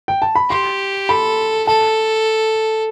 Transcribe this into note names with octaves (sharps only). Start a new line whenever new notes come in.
G5
A5
B5
G4 C6
A4 B5
A4 A5